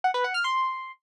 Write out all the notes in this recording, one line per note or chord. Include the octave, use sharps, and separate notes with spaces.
F#5
B4
F#5
F6
C6